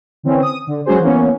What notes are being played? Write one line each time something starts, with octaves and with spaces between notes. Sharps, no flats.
D3 E3 C4 C#4
D#6
D3
F#3 G#3 C#4 F#4 G#4 C5
E3 A#3 B3 C#4